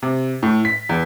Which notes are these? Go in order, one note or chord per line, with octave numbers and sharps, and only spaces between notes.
C3
A2
B6
E2